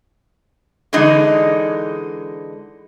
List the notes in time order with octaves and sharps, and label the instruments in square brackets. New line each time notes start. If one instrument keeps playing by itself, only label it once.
[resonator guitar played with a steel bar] D3 E3 G#3 D#4